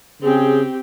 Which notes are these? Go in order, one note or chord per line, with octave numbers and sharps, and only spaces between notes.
C#3 C4 G4 G#4